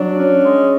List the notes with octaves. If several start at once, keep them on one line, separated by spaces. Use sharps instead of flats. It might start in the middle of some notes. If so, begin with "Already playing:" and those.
Already playing: F#3 D4
C#4
G#3